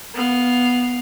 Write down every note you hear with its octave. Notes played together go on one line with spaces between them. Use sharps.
B3 F5